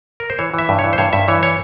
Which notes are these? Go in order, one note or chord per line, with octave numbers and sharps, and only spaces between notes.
A#4
C5
E3 C#5
E3 E5
G2
C#5
E3
C5
G2 C#5
G2 E5
E3 C#5
C#5